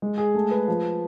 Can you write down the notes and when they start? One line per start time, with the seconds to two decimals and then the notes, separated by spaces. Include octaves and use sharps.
0.02 G#3
0.18 G#4
0.34 A3
0.51 B4
0.68 F3